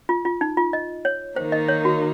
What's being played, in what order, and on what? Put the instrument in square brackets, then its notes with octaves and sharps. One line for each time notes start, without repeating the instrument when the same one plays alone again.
[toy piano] F4
F4
D#4
F4
D#5
C#5
[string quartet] D#3 A#3 D#4 [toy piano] C5
[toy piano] D#5
C#5
F#4